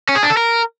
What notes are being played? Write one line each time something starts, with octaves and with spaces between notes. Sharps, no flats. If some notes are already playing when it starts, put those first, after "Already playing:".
C#4
G#4
D4
A4
A#4